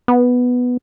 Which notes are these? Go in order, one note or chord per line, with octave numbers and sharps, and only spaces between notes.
B3